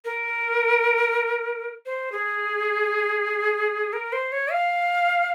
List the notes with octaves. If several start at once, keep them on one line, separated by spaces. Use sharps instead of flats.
A#4
C5
G#4
A#4
C5
C#5
F5